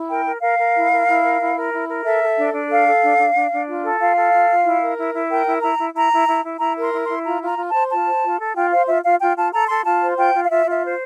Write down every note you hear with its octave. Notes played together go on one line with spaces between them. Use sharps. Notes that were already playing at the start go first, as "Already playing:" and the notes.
Already playing: E4
A#4 G5
A#4
A#4 F5
A#4
E4
A#4
E4
A#4
E4
A#4
E4
A#4
A4 E5
A4
D4
D4
A4 F5
A4
D4
D4
D4
D4
F4
A4
F4 F5
A4
F4
F4
E4
A#4
E4
E4
A#4 G5
E4
E4 A#5
E4
E4 A#5
E4
E4
E4
E4 A#5
A#4
C6
E4
C6
E4
F4 A#5
F4 A#5
F4
A5
C5
F4 A5
C5
F4
A4
F4 G5
C5 F5
F4 E5
F4 F5
F4 G5
F4 A5
A4 A#5
A4 C6
F4 A5
C5
F4 G5
F4
F5
F4 E5
F4
E5
C5